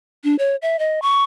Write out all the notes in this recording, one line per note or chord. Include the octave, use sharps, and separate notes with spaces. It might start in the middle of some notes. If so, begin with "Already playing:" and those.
D4
C#5
E5
D#5
C#6